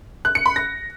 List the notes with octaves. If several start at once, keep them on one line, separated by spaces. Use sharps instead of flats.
F#6
C#7
B5
A#6